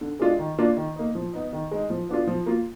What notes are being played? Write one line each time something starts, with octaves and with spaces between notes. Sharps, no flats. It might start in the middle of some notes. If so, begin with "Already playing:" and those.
D3
G#3 D4 F4
D#3
A#3 D4 F4
D#3
A#3 D#4
F3
B3 D#4
D#3
G#3 D#4
F3
B3 D4 F4
F3
A#3 F4